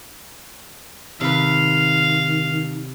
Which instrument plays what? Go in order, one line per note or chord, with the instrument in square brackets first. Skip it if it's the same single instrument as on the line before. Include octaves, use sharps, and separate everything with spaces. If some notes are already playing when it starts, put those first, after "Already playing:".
[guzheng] C3 B4 [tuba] D#3 [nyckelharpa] F5